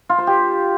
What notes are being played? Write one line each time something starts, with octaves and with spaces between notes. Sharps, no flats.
F4
C5
G4